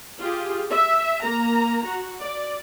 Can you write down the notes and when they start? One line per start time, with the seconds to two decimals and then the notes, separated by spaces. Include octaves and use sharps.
0.19 F4 G4 G#4
0.71 E5
1.22 A#3 A#5
1.86 F#4
2.21 D5